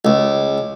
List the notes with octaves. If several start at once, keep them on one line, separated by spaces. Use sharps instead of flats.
C#2